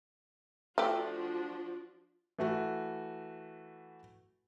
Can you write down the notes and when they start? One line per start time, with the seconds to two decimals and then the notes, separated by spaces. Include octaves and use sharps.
0.78 F3 A3 D4 F#4 G4
2.39 E3 A3 F#4